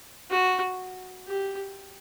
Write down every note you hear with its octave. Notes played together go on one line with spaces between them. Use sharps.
F#4
G4